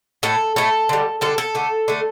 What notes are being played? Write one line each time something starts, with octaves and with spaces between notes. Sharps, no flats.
A2 A3 A4
A2 A3 A4
D3 G3
D3 G3 A4
A4
D3 A3
D3 A3